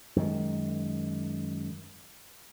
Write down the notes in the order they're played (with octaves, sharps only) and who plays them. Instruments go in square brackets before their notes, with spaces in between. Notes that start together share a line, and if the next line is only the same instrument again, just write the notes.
[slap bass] F#2 D#3 G#3